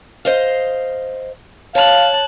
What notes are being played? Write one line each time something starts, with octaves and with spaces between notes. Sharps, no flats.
C5 D#5 F5
C#5 F5 A5 F#6